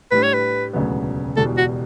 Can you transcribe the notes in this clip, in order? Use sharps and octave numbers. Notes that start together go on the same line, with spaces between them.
A2 G3 D4 B4
C#5
B4
E1 D2 C#3 F#3 B3
E1 E2 B2 G3 A4
F#4